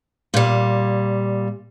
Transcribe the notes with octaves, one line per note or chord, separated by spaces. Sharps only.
A#2 G3